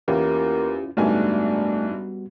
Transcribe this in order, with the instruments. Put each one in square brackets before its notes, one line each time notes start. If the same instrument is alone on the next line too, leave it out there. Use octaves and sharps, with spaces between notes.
[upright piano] E2 [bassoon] A#3 [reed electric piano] C#4 E4 F4 [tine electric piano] G4
[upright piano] F#1 G#2 G#5 [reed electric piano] G3 B3 F#4 [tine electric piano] A3 [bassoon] D4